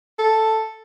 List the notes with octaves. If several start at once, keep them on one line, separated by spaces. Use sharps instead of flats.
A4